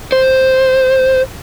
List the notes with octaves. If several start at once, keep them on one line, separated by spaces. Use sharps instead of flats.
C5